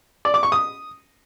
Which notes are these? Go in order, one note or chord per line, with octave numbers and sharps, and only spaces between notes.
D5
D6
C#6
D#6